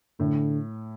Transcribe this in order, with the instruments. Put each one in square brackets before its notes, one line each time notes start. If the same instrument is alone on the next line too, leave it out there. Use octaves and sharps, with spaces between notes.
[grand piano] A2 [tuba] D3